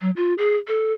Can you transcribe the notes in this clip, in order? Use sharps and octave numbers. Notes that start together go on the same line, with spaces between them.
F#3
F4
G#4
A4